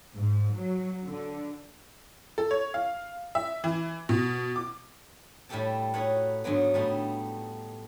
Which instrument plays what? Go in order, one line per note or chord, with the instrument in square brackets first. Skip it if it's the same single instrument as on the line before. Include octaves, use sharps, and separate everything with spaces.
[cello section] G#2
F#3
D3
[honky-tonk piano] A4
C#5
F5
E5
E3
B2
D6
[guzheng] A2 G3 A3 G4 A4 A5
D#4 F#4 A4 B4 C#5 F#5
G#2 D3 F#3 B3
A2 G3 A3 D#4